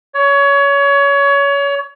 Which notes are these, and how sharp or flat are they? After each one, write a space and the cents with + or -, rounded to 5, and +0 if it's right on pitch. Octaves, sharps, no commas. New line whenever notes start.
C#5 +25